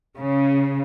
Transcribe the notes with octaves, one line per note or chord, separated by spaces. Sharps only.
C#3